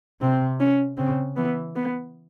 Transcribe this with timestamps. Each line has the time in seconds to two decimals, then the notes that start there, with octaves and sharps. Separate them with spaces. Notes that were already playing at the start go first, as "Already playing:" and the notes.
0.21 C3 C4
0.60 C#4
0.97 C#3 C4
1.36 E3 B3
1.76 B3